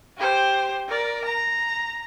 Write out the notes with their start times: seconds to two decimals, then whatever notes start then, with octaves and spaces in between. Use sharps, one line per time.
0.17 G4 C5
0.88 A#4 D5
1.25 A#5